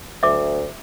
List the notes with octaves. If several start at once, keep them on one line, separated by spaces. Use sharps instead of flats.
D2 E5 D6